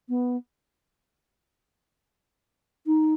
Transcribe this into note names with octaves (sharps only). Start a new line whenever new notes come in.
B3
D#4